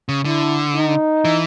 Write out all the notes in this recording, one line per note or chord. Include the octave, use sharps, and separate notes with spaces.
C#3
D3 E4
D#4
E3